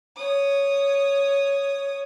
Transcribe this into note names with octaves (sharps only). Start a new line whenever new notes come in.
C#5 D#6